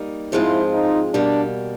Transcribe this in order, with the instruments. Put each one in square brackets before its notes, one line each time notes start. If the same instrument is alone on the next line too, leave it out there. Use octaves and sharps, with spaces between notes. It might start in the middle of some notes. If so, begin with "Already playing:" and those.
Already playing: [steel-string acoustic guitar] G3 A#3 D#4
[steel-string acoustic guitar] G#2 F3 G#3 C4 F4 [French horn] E4
[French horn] D#4
[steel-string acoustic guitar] B2 G3 A#3 [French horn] D4